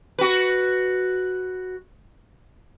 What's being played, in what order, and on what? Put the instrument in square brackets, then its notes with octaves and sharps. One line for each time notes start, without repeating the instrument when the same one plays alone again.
[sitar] F#4 B4